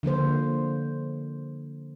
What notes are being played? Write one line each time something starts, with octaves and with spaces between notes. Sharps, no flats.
D3 F3 A#3 C5